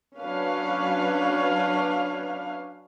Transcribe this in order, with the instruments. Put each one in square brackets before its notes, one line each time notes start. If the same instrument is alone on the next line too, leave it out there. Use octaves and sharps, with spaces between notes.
[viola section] F#3 C#4 D4 B4 F5